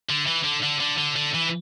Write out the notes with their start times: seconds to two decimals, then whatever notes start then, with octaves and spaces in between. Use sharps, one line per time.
0.09 D3
0.26 E3
0.44 D3
0.62 D3
0.81 D3
0.98 D3
1.16 D3
1.34 E3